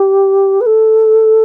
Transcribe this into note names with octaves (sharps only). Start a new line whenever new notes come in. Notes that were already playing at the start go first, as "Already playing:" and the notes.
Already playing: G4
B4
A4